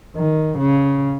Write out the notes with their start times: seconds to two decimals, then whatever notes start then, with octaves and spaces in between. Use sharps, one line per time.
0.16 D#3
0.58 C#3